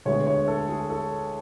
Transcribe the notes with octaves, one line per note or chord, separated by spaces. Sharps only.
D2 D3 G#3 B3 C#5
C#5
A4
G#4
A4